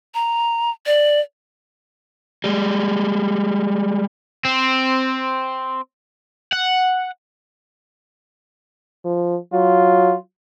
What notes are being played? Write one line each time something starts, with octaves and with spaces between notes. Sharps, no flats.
A#5
D5
G3 G#3
C4
F#5
F3
F#3 F4